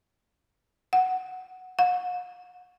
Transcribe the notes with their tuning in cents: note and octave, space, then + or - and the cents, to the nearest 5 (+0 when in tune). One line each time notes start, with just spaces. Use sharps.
F#5 +0
F#5 -45